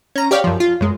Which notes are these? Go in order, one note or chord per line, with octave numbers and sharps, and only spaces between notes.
C#4 A#5
G4 C#5 D5 F5 G5
F#2 F3
F4
F#2 G#3